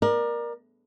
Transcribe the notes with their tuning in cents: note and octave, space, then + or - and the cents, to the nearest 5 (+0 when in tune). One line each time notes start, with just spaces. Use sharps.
A#4 +15 D5 +30